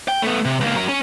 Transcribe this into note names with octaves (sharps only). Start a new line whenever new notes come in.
G5
A3 B3
C3
C#2 A#3
F#3 A#4
C#4